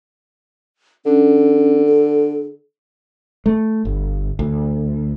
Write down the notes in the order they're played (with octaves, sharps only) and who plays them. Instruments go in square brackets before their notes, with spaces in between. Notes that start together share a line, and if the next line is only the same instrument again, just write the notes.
[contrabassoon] D3 [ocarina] C#4
[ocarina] A4
[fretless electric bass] A3
G1
D2